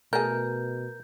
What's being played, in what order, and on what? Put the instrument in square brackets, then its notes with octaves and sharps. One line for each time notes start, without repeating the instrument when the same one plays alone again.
[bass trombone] B2 [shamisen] A3 G#4 [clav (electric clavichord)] A#4 [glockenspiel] G6